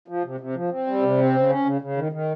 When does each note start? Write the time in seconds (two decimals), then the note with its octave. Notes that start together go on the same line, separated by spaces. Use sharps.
0.08 F3
0.24 C3
0.40 C3
0.55 F3
0.71 C4
0.87 G3
1.02 C3
1.18 C4
1.35 C#3
1.49 C#4
1.65 C#3
1.81 C#3
1.97 D#3
2.12 D#3